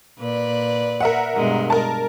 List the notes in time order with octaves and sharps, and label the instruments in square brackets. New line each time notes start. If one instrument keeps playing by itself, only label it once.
[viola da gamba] A#2 B4 D5
[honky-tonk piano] A#4 E5 F#5
[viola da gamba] G2 B2 G#3
[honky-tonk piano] A#4 A5